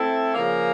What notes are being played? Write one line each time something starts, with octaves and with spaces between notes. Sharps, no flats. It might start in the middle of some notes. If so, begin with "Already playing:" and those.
Already playing: A3 C4 E4 A4
C#3 F3 A#3